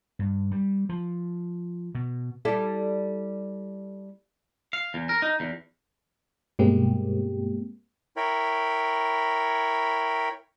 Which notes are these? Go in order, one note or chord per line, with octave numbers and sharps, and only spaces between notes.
G2
G3
F3
B2
G3 E4 A4
F5
E2
A#4
D#4
E2
G2 B2 G#3 A#3 C4 G4
E4 A#4 C#5 G5 B5